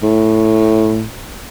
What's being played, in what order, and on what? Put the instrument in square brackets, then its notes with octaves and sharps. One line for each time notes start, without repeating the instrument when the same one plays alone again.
[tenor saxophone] A2